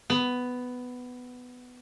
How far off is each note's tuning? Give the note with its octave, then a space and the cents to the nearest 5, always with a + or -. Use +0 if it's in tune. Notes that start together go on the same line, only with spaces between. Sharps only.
B3 +10